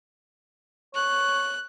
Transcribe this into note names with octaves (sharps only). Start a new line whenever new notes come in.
C#5 F#6